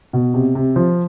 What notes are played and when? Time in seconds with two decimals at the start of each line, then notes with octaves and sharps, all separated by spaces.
0.13 B2
0.34 C3
0.55 C3
0.76 F3